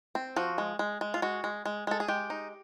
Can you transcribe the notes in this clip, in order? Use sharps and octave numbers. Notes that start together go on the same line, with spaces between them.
C4
F3 F#4
G#3
G#3
G#3
F4
G#3 F#4
G#3
G#3
G#3 A4
G#4
G#3 G4
D#4